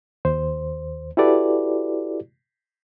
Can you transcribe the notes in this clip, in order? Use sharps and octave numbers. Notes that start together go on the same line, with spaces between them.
D#2 C5
E4 F#4 G4 A4 B4 D5